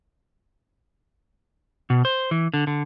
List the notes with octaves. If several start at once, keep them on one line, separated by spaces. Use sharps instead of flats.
B2
C5
E3
D3
D3